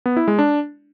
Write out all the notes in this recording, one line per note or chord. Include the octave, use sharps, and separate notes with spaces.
B3
E4
G#3
D4